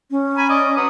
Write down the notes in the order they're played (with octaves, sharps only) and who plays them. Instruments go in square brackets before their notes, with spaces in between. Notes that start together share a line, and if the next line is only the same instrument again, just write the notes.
[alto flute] C#4
[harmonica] G#5 A#5 B5
D5 D#5
F#3 B4 D#6